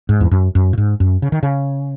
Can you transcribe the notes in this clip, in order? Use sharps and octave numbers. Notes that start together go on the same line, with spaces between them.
G#2
E2
F#2
F#2
A#2
G#2
F#2
C#3
D#3
C#3